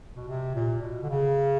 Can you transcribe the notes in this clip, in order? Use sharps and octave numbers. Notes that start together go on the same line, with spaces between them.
B2
C3
A#2
B2
D3
C#3